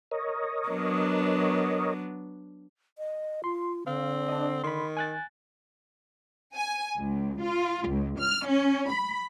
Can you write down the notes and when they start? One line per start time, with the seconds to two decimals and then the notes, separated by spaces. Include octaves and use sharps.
0.11 A#4 C#5 D#5
0.69 F#3 B3 D4
2.98 D#5
3.44 F4 C6
3.87 D3 C4 F5
4.29 D4 D#5
4.64 D#3 B5 C6
4.97 G#5 F#6 A6
6.54 G#5
6.98 C#2
7.42 F4
7.88 C#2
8.19 F6
8.48 C#4
8.92 B5